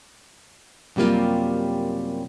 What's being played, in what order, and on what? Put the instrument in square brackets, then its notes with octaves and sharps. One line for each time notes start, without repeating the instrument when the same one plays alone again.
[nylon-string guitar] F#2 C3 G3 A#3 F4